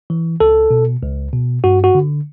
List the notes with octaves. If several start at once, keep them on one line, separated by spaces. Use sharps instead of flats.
E3
C#2 A4
B2
C#2
B2
G2 F#4
F#4
D3